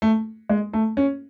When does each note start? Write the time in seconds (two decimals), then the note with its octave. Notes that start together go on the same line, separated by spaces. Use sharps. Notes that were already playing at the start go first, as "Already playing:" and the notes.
0.02 A3
0.49 G#3
0.73 A3
0.97 C#4